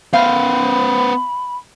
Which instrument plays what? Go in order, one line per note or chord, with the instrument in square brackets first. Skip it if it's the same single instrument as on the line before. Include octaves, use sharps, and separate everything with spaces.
[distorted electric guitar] B3 C5 [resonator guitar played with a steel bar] F5 [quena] B5